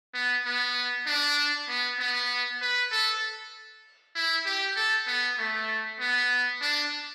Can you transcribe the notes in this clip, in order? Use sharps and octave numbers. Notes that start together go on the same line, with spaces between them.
B3
B3
D4
B3
B3
B4
A4
E4
G4
A4
B3
A3
B3
D4